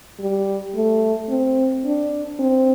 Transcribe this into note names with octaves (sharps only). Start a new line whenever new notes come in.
G3
A3
C4
D4
C4